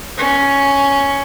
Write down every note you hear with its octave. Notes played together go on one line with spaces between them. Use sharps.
C#4